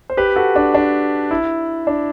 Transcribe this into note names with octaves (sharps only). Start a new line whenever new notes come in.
C5
G4 B4
F#4 A4
D4 F#4
D4
E4
D4